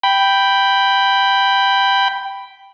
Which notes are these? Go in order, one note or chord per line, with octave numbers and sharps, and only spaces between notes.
G5 B5